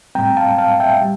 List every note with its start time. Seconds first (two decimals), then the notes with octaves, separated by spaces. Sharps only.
0.15 A2 G3 C4 G5 A#5
0.37 F5 A5
0.58 F5 A5
0.80 E5 G5
1.01 G3